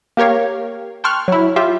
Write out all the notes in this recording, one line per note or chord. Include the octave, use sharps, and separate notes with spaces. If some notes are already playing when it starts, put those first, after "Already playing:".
A#3 G4 A#4 C#5 F5
G5 A5 C6 C#6 F6 F#6
F#3 E4
F4 G4 E5